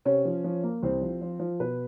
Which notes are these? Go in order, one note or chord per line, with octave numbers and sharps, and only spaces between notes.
C3 C#4 C#5
F3
F3
A#3
C2 C4 C5
F3
F3
F3
B2 B4